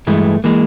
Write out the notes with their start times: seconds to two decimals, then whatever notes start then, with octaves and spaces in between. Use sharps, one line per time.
0.07 G2 E3 G#3 A3
0.44 E3 G#3 A#3